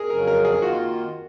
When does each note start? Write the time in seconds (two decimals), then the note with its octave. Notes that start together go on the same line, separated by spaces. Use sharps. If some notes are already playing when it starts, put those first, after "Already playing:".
Already playing: G#4 A#4
0.10 F2 C#3 F#3 C#4 A#4
0.27 A#4
0.45 G#4
0.62 D#3 A#3 F4 F#4